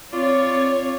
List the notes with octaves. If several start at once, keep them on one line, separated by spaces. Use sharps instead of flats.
C4 F4 C#5 D5